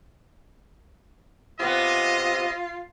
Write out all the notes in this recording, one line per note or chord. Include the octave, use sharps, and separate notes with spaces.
C3 B3 F4 D#5